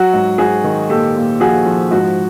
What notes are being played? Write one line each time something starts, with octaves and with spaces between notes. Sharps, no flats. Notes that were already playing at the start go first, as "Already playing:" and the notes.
Already playing: F#3 F#4
G#2
G#2 F#4 G#4
D#3
A#2 G4 A4
A#2
F3 F#4 G#4
F3
G#2 F#4